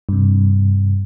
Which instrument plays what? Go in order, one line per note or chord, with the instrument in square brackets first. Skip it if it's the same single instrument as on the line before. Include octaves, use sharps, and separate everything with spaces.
[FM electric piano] G2 C3